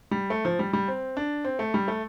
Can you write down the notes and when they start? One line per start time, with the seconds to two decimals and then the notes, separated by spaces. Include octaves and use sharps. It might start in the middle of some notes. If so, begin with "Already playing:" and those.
0.11 G3
0.30 A3
0.45 F3
0.59 G3
0.73 G3
0.88 C4
1.17 D4
1.44 C4
1.59 A3
1.74 G3
1.88 A3